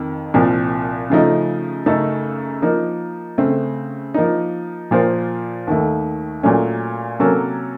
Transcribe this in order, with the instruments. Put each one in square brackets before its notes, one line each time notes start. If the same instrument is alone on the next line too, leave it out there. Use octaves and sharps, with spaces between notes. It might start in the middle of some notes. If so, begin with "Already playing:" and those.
Already playing: [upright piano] F2 D#3
C2 A#2 F3
C#3 F3 A3 D#4
F#2 C#3 A3 D#4 A4
F3 A#3 D#4
C#3 A3 C4
F3 A#3 D#4
A#2 F3 A#3 F4 C5
D#2 D#3 A3
A#2 F#3 A3 C#4
C3 F#3 A#3 C#4 A4